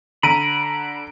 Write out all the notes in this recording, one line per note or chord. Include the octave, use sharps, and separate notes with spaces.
D3 A#5 B5 D7 D#7